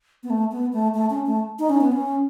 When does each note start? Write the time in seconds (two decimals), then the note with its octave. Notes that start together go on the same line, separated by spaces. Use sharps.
0.23 B3
0.30 A3
0.52 B3
0.73 A3
0.94 A3
1.10 C#4
1.26 A3
1.59 D#4
1.70 C#4
1.81 B3
1.92 C#4